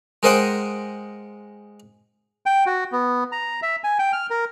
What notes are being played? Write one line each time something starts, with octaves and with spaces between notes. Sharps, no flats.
G#3 A#4 C5 D#5 F#5 G5
G5
F#4
B3
A#5
E5
G#5
G5
F6
A#4